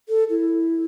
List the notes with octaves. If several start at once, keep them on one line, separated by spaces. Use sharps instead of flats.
A4
E4